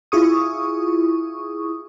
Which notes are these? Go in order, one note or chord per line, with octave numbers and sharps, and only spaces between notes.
E4 F4 G#4 C#6 D#6